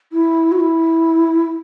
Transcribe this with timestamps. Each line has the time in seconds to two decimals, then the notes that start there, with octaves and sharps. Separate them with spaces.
0.12 E4
0.52 F#4
0.59 E4